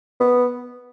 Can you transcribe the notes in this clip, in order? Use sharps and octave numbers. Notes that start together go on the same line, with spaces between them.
B3